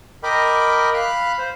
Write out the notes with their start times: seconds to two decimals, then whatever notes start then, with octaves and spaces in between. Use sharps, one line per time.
0.23 A#4 D#5 G5 B5 D6
0.94 F5 B5 F#6
1.39 C5